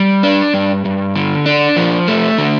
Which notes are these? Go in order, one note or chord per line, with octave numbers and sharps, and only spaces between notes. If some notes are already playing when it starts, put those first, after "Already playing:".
Already playing: G3
D4
G2
G2
D3
D4
F3
A3
D3